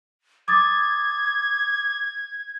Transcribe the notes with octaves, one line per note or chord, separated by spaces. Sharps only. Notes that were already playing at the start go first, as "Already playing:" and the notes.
D6 D#6 G#6 A6